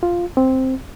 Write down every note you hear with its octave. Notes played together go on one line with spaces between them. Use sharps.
F4
C4